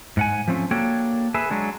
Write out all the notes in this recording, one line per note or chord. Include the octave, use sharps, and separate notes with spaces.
G#2 F#5 G#5
F3 A3 C4 C#4
A#3 D4 F#4 A4 C#5 G5
G#4 A4 B4 E5
F#3 G#3 D4 G#4